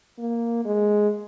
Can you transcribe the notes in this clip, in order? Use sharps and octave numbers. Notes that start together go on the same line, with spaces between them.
A#3
G#3